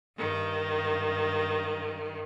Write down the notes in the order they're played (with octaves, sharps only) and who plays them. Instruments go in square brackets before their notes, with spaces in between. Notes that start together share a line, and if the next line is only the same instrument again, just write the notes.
[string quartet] G2 D#3